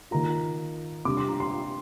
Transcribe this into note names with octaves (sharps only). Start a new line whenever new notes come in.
D#3 A#3 F4 A#5
C3 G3 D4 D6
C6
A#5
C6